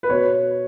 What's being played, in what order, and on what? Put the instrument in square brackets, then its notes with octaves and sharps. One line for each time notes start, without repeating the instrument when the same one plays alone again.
[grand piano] B4
B2 C#5